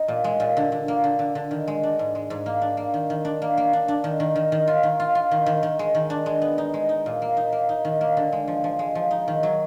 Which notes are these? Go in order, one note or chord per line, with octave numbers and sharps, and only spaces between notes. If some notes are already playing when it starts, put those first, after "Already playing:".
Already playing: D#4
A#2
G#3
A#2
D3
D3
A#3
D3
D3
D3
D#3
G#3
D4
G#2
G#3
G#2
A#3
D4
A#3
D#3
D#3
D4
A#3
A#3
D4
D4
D#3
D#3
D#3
D#3
F4
D#3
F4
F4
D#3
D#3
D#3
G#3
D#3
D4
G#3
B3
D#4
G#3
D#4
A#2
A#3
D#4
A#3
D#4
D#3
A#3
D3
G#3
F3
F3
G#3
F3
D#4
D#3
F#3